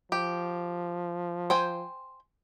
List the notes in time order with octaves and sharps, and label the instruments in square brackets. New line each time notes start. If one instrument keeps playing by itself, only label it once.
[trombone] F3 [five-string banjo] G4
[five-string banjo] C5 G5 G#5